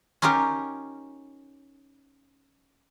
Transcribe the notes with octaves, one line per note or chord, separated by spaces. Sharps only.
C#4 D#4 F4 G4 A#4